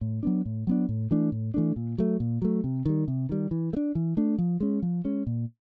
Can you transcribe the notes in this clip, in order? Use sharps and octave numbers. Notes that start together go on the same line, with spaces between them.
A2
F#3 B3 D4
A2
F#3 B3 D4
A2
E3 A3 D4
A2
E3 A3 D4
A#2
F#3 A3
A#2
F#3 A3
C3
D#3 G3
C3
D#3 G3
E3
A3
D4
E3
A3 D4
F3
G#3 C#4
F3
G#3 C#4
A#2